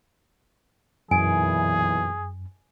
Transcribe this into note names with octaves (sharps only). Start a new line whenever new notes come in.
B1 F#2 A#2 E3 G#4 G#5